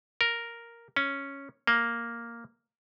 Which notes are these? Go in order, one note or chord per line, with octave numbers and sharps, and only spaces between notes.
A#4
C#4
A#3